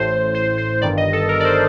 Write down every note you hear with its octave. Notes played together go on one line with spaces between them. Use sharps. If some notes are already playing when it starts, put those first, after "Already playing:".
Already playing: A1 A2 C5
C5
C5
G1 G2 D#3 D5
D#5
A4
A#4
D5
C5